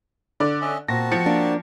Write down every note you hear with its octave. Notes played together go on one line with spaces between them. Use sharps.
D3 D5
C#4 D#5 E5
A#2 C4 F#4 A5 A#6
F3 C#7
A#3 D4